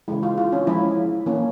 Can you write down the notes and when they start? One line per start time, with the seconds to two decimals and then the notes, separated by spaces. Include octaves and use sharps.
0.08 C#3 E3 G#3 E4
0.23 F4
0.38 F4
0.52 C#4
0.67 F3 G#3 C#4 E4
1.26 E3 A#3 C#4